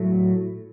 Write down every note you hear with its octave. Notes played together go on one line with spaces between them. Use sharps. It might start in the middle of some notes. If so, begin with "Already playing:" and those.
Already playing: A2 F#3 A3